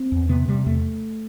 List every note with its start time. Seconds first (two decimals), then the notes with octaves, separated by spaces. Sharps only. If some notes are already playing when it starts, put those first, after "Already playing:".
Already playing: C4
0.12 E2
0.29 C3 B3
0.48 C3 G3
0.66 E2 A3